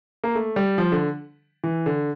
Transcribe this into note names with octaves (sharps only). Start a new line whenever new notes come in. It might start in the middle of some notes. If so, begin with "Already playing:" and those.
A#3
A3
G3
F3
D3
E3
D3